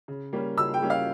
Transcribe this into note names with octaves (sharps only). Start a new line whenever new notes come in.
C#3
G3 A#3 C#4
C#3 E6
G5
G3 A#3 C#4
F5